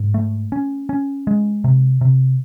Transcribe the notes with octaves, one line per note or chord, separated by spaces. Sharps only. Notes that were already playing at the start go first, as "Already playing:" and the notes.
Already playing: G#2
A3
C#4
C#4
G#3
C3
C3